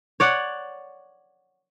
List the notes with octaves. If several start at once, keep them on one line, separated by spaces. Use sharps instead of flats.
C#5 D5 F#5